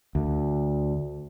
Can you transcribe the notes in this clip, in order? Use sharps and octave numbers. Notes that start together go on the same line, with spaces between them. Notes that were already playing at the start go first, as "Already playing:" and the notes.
D2